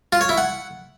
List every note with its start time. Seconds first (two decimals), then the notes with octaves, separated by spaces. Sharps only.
0.12 F4
0.21 C#5
0.29 E4
0.38 F#5